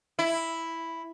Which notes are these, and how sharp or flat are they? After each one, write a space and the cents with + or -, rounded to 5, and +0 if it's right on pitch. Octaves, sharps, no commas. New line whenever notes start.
E4 +0